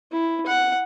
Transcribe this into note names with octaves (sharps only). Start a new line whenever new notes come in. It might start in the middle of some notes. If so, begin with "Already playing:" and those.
E4
F#5